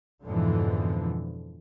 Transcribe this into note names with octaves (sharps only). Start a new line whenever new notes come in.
F2 G#2 B2 D3 E3 F3